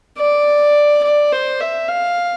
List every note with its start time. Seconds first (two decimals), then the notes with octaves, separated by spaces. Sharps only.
0.18 D5
1.03 D5
1.32 C5
1.60 E5
1.88 F5